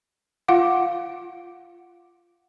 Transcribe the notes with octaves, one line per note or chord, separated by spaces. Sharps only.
F4 F5 F#5 D6